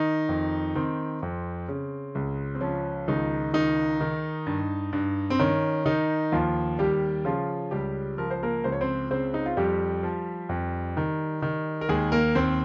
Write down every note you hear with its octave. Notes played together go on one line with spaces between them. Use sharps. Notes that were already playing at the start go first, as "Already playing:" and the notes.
Already playing: D#3 D#4
F2
D#3 C4
F2
C#3
C#2
C4
F3 C#4
C#2 D#3 D#4
D#3 D#4
D#3
G2
G2
C4
D#3 C#4
D#3 D#4
D#2 F3 F4
D#2 G3 G4
C#3 F3 F4
C#2 G3 G4
F3 A#4
C5
A#3 A#4
C#2 C5
C#5
C4 C5
C#3 C4 C5
D#4
F4
F2 G3 G4
F3
F2
D#3
D#3
A#4
D#2 G#3 G#4
A#3 A#4
D#2 C4 C5